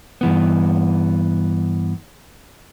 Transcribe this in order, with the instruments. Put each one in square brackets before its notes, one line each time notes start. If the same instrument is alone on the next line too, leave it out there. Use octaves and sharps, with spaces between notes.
[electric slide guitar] G2 E3 B3